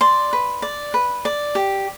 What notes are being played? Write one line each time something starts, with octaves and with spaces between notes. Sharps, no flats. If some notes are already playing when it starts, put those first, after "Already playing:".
D5 C6
B4
D5
B4
D5
G4